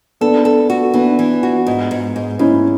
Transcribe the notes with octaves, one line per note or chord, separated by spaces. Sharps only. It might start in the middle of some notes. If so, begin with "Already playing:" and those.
B3 D4 A4
A4
F#4
E3 B3 D4
E3
F#4
G#2
G#2
G#2
G#2 C#4 E4